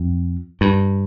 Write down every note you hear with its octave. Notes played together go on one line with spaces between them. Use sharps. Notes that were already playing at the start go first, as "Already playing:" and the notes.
Already playing: F2
G2